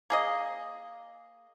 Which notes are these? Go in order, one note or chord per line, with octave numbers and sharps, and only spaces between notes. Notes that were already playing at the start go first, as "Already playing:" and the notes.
A#3 G#4 D#5